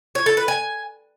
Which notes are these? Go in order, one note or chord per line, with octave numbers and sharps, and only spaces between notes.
C#5
A4
B4
G#5